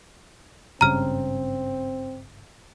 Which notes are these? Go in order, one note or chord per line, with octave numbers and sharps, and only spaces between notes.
G#1 G2 C#3 C4 A#5 F6